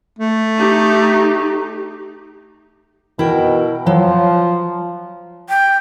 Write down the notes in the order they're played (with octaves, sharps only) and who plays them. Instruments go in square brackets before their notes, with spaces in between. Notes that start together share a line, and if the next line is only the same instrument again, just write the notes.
[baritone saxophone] A3
[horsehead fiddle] D#4 G4
[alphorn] B2 [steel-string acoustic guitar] E4 A#4 G5
[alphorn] F3 [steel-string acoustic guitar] F#3
[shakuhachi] G5